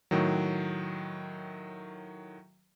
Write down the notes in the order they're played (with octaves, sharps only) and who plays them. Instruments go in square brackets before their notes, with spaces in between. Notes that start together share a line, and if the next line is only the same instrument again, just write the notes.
[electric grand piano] A2 D#3 F#3